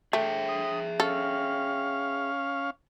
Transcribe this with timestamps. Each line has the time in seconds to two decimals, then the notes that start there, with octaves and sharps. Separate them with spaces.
0.13 A3 G#4 E5 G5
0.49 D#6
1.00 C#4 A4 F5